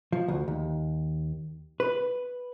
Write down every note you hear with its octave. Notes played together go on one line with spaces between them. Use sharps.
F3
D2
D#2
B4